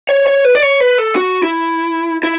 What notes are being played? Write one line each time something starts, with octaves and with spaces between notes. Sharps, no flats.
C#5
C#5
B4
D5
C#5
B4
A4
F#4
E4
E4